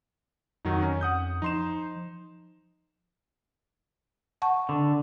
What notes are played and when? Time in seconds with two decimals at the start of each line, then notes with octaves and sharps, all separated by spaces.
0.65 F2 D#3 F#3 D#4
0.82 C#4
1.01 F#5 D#6 G6
1.42 F3 D#4 C6 E7
4.42 F#5 A5 C#6
4.69 D3